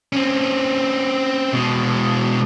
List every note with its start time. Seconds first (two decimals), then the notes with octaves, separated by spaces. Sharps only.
0.13 C4 C#4
1.53 B2 G#3